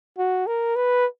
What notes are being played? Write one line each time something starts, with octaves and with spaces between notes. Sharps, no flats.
F#4
A#4
B4